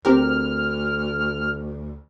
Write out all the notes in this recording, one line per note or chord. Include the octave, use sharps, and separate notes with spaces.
D2 C4 G4 A#4 F6